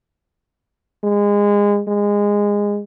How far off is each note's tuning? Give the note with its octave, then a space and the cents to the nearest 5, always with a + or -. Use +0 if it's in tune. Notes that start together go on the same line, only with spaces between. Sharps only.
G#3 -25
G#3 -20